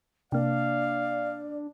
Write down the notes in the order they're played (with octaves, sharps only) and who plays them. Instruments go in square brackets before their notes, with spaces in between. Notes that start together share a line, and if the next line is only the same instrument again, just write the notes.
[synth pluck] C3 A#3 [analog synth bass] D4 [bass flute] D5 [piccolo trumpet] F5